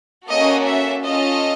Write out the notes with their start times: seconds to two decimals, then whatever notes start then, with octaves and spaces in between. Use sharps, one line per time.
0.29 A#3 C#4 F#4 A4 D#5
0.66 E5
1.04 C#4 F4 A4 D#5